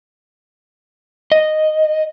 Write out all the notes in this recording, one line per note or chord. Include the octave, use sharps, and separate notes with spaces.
D#5